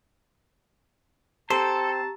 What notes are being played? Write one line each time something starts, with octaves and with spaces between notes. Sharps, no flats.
C4 G4 A4 C5 A5 A#5